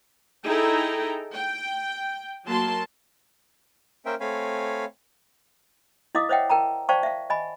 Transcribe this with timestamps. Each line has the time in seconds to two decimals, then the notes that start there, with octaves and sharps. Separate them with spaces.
0.44 D#4 E4 G#4 A4 G5 A#5
1.33 G5
2.46 F#3 A#3 A5 C6
4.06 A#3 C#4 A#4 C5 E5 G5
4.20 A3 C4 C#5 F5 G#5 B5
6.15 E4 D#5 F5 D6 D#6
6.29 C5 C#5 D#5 E5 F#5 G5
6.50 A#4 G5 A5 A#5
6.89 C5 D5 F5 G5 A5 C#6
7.03 E5 F5
7.30 D#5 G#5 B5